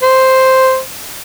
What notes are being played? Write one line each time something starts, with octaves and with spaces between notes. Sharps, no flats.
C5